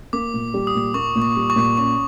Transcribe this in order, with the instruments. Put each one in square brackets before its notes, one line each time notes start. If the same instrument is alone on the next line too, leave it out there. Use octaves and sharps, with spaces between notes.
[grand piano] A#3 [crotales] D6
[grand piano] A#2
G3
[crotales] D#6
[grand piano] A#2
[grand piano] A#3 [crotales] C#6
[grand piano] A#2
[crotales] C#6
[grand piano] G3
[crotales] C#6
[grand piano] A#2
[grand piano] C#4 [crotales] C#6